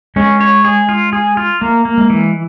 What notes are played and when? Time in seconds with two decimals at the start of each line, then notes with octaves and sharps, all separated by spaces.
0.16 G#3 C#4
0.41 C#5
0.64 G#4
0.89 F4
1.13 G#4
1.37 F4
1.61 A3 A#3
1.85 A#3
1.98 G#3
2.10 E3